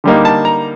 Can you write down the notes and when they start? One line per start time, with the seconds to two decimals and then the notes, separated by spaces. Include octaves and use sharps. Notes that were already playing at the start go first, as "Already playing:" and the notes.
0.04 D3 G3 A#3 D#4
0.25 A5
0.45 A#5